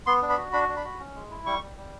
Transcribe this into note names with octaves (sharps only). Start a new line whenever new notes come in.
B3 C6
D4
B5
F#4
D4 B5
D4
B5
F#4
C#4
G#3
E4
G3 C#6
G3
G3